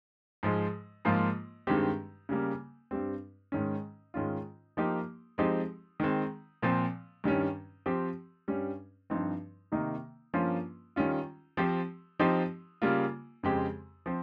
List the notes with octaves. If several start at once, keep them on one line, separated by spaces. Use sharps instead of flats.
G#2 F3 G#3
G#2 F3 A#3 F4
G2 D#3 G#3 C4 G4
C#3 G3 A#3
G2 G3 C4
G#2 D#3 G#3 C#4
G#2 D#3 G#3 C#4 F4
F3 A#3 D#4 G4
F3 G#3 C4 D#4 G4
D#3 G#3 C4
A#2 F3 C4
G2 D#3 G3 C#4
F3 C4 G4
G2 G3 C#4
G2 F3 C4 D#4
C3 D#3 A#3 D#4
G2 F3 A#3 C#4 F4
D#3 G3 C#4 F4
F3 C4 G4
F3 C4 D#4 G4
C#3 G3 A#3 F4
F2 C#3 G#3 C4 G4
F3 C4